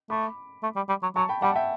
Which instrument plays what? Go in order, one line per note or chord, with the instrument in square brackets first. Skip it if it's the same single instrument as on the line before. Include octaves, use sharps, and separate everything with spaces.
[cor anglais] A3 [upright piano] B5 D6
[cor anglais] A3
G3
G3
F#3
[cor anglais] F#3 [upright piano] A5 C#6
[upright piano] G5 B5
[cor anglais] G3 [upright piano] F#5 A5
[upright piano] E5 G5